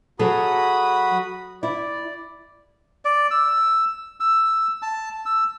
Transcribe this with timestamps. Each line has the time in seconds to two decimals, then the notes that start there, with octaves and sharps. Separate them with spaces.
0.19 F#3 F#4 G#4 A4 B5 D#6
1.63 E4 D5
3.05 D5
3.31 E6
4.20 E6
4.82 A5
5.26 E6